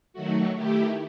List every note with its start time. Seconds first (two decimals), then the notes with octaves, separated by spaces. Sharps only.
0.13 D#3 F#3 A3 F#4
0.55 D#3 A3 E4 G4